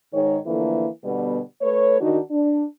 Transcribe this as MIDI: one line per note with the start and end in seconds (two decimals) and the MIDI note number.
0.14 0.38 44
0.14 0.38 51
0.14 0.38 56
0.14 0.38 73
0.46 0.86 50
0.46 0.86 52
0.46 0.86 53
0.46 0.86 57
0.46 0.86 58
1.04 1.40 47
1.04 1.40 50
1.04 1.40 55
1.04 1.40 59
1.61 2.00 57
1.61 2.00 71
1.61 2.00 73
2.00 2.20 51
2.00 2.20 62
2.00 2.20 63
2.00 2.20 66
2.31 2.64 62